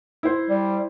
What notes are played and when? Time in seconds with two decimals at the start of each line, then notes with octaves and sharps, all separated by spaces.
0.23 E4 C5
0.50 G3